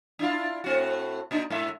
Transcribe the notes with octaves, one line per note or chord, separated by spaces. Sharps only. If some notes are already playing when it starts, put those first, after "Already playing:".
D4 E4 F4
A2 C4 F#4
A#2 D4 D#4
G#2 E5